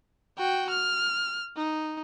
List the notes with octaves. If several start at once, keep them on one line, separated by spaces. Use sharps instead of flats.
F#4 G5
F6
D#4